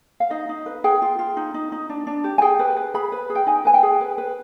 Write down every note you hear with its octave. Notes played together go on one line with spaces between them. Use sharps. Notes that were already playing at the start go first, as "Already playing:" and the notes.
F5
D#4 D#5
D#4
B4
G#4 G5
F4
F4
D#4
D#4
D#4
D4
D4
G4
G#5
G#4 G5
B4
B4
G#4 B5
B4
G#4
G5
D#4 G#5
B4 G#5
G5
G#4
B4
B4